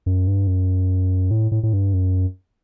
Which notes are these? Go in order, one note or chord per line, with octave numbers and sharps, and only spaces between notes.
F#2
G2
F#2
A2
A2
A2
G2
F#2